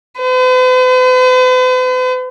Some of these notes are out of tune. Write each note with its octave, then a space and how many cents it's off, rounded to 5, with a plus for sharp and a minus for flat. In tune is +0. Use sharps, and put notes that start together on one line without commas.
B4 +45